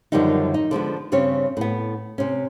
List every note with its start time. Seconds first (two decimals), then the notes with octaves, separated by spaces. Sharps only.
0.12 F#2 D3 D#3 F3 G3 D#4
0.54 D#4
0.71 D3 F3 G#3 B3
1.12 G2 C#3 C4 C#4 G4 C#5
1.57 A2 B3
2.18 C3 C#4